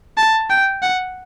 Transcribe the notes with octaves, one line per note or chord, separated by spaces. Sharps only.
A5
G5
F#5